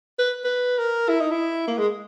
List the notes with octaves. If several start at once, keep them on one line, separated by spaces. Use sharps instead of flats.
B4
B4
A#4
E4
D#4
E4
A#3
G#3